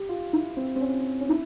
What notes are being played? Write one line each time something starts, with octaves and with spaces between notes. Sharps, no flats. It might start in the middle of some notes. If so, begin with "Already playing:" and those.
Already playing: G4
F4
E4
C4
C4
C#4
C#4
E4